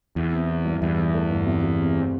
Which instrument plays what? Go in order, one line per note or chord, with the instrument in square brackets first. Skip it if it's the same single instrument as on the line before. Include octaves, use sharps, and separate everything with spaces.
[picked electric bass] E2 [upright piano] E4
[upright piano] C4
E4
G2
[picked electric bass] E2 [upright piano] G2
[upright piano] E3
A3
G1
C3
C3
C4
C4